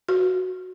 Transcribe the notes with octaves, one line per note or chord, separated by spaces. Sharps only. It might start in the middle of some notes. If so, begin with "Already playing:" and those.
F#4